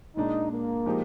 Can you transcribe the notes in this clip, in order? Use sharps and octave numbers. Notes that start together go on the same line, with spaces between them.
A#2 G#3 D4 D#4
A#3
F3 G#3 D#4 G4